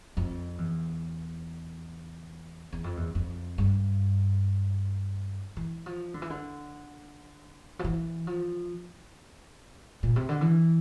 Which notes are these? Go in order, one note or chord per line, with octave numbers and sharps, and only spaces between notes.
F2
E2
E2
F2
E2
F2
G2
E3
F3
D3
E3
D3
F3
E3
F3
A#2
C3
D3
E3